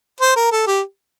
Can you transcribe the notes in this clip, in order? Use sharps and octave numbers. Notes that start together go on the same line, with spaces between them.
C5
A#4
A4
G4